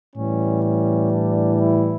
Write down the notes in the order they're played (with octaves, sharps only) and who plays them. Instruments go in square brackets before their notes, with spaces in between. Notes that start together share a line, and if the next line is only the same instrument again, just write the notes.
[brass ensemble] A2 E3 G3 C#4
C#4
D4
E4